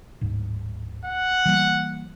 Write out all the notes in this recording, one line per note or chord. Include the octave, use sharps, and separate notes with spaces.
D1 G#2
F#5
E3 G3 A#3